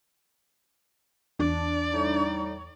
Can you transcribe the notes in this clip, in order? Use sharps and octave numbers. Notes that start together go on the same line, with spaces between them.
E2 D4 D5
A2 G3 D#4